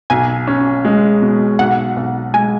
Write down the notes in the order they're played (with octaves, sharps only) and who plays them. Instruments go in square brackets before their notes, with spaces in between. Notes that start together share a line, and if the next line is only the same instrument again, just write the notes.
[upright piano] B1 [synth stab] G#5
[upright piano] C#4
G#3
B2
[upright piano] B1 [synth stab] F#5
[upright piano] B1
[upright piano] G#3 [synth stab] G#5